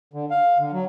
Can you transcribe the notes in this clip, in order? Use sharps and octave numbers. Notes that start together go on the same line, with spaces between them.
D3
F5
D3
F#3